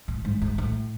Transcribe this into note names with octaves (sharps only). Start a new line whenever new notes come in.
A2
G#2
G#2
A2